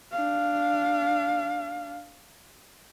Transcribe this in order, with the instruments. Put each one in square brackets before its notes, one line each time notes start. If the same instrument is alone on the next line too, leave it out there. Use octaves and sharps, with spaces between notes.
[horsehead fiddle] D4 F5